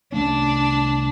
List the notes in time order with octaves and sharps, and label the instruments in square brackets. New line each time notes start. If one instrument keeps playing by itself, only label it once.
[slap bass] C2 A3 C#4 [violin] D4